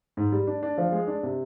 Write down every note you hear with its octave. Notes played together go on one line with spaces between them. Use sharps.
G#2
G3
D4
D4
F3
G#3
D4
C3